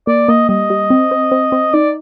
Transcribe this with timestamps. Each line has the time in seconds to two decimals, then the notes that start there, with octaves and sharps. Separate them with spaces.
0.07 A#3 D5
0.28 A#3 D#5
0.49 G3 D#5
0.70 G3
0.90 C4
1.11 C4
1.32 C4
1.52 C4
1.74 D#4 D5